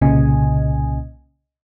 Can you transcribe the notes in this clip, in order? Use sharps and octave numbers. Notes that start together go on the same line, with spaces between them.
C2 A#2 C#3 D#5 G#5